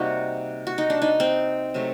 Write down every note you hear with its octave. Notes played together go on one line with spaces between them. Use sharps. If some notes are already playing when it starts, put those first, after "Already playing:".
Already playing: C3 G3 A#3 D#4 F#4
F#4
D#4
D4
D#4
C4
C3 F#3 A3